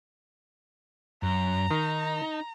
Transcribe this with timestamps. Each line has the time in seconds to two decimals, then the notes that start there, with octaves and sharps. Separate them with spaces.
1.23 F#2 A#5
1.71 D#3 D#4